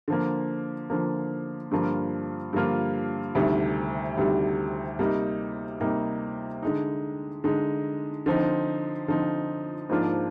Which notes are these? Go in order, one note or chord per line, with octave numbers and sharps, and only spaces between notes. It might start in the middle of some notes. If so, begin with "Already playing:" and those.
D3 F3 A#3
D3 F3 A#3
G2 D3 F3 A#3 F4
G2 D3 F3 A#3 F4
D2 C3 D#3 G3
D2 C3 D#3 G3
C3 G3 A#3 D#4
C3 G3 A#3 D#4
D3 G#3 D#4
D3 G#3 D#4
D3 F3 C4 D#4
D3 F3 C4 D#4
G#2 F3 A#3 D4 F4